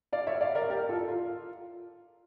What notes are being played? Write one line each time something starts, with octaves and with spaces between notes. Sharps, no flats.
D5 F5
C#5 E5
D5 F5
A#4 D5
G4 A#4
F4 A4
F4